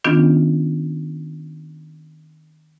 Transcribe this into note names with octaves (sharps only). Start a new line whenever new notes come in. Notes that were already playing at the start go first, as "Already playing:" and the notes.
D#3 B3 C#4 D4 F4